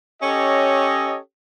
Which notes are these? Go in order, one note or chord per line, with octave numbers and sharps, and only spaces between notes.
C#4 G4 A4 C#5 D#5